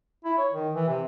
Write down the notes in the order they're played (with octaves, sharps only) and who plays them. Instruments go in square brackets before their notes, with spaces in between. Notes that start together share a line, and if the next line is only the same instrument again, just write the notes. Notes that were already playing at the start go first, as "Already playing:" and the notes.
[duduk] E4
C#5
D#3
E3
C3